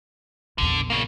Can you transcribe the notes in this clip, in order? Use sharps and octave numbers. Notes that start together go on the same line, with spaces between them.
A#1 E2 D3
C#3 A#3